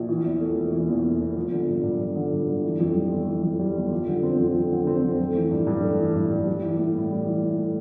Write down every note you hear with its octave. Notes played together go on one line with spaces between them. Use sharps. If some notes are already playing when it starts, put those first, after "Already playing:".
Already playing: A#1
E3
E2
A3
E1
E3
E2
A3
E1
F3
D3
G2
G2
F3
D3
G2
G2
E3
F2
G3
G1
E3
F2
G3
G1
F3
D3
C4
F2
F3
D3
C4
F2
A3
E3
G2
G2
A3
E3
G2
G2
G3
E3
A2
A2
G3
E3
A2
A2